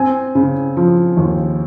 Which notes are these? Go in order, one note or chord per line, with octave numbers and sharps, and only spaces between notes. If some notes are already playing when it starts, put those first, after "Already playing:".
Already playing: C4 G#5
C#3
F3
D#2